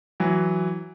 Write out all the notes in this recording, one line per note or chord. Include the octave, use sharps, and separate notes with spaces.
E3 F#3